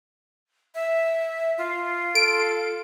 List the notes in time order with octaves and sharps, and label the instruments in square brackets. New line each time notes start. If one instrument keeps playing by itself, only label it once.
[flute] E5
F4
[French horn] A4 [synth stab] D7